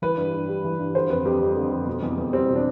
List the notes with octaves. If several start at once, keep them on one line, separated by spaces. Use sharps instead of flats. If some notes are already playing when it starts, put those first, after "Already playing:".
E3 B4
G2
G2
G3
E3
G2
D3 C5
F2 B4
F2 G4
G3
D3
F2
B2
E2
E2
G3 C4
B2
D4